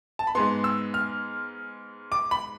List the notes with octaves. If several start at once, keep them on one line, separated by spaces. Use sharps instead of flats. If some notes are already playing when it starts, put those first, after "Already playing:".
A5
B5
G#2 G#3 B3 C6
E6
F6
D6
B5